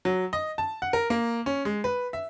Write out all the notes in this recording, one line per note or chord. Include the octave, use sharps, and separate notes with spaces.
F#3
D#5
A5
F#5
A#4
A#3
C#4
G#3
B4
E5